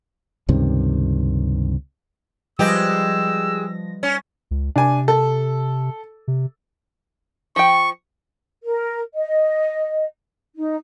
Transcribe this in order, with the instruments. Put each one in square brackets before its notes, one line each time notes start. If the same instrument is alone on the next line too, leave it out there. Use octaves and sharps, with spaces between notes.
[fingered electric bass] C#2 G2 C3 D#3
[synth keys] F3 A#6 [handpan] G3 B4 D#5 [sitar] G#3 G4 [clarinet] E6
[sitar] C#4
[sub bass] C#2
[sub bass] C3 [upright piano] D4 G#5
[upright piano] A4
[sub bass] C3
[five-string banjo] F3 G5 [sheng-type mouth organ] C#6
[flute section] A#4
D#5
D#4